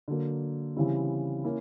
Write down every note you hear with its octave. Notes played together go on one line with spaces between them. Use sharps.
D3 F#3 A#3
C#3 E3 G3 C4 E4
A#3 C#4 E4